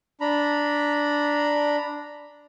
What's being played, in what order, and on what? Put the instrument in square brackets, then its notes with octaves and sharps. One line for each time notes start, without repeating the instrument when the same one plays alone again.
[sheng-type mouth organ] D4 A#5 B5